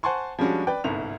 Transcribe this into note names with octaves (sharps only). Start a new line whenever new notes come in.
C5 F#5 G#5 A5 C6 C#6
F3 G3 G#3 C#4 D4 F#4
B4 D5 G5
G1 C2 G#2 F7